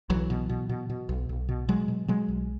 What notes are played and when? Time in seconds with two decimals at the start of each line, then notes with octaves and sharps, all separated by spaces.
0.10 B1 E3 F#3
0.30 B2
0.49 B2
0.69 B2
0.90 B2
1.09 B1
1.29 B1
1.49 B2
1.68 B2 F#3 G#3
1.88 B2
2.08 B2 F#3 G#3
2.28 B1